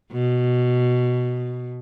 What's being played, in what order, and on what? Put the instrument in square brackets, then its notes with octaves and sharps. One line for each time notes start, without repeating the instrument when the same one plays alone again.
[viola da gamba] B2